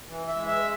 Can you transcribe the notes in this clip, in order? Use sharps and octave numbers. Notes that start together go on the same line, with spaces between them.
E3
E5
G#3
E5